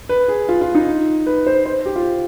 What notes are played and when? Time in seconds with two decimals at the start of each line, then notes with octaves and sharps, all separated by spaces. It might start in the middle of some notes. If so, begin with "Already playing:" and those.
0.09 B4
0.28 G#4
0.49 F4
0.61 F4
0.75 D#4
1.26 B4
1.47 C5
1.66 C5
1.86 G4
1.96 F4